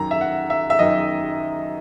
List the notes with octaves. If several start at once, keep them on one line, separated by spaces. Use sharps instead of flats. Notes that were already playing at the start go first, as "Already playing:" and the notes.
Already playing: F#2 D#3 A#5
E5
F#5
E5
E5
F#2 D#3 D#5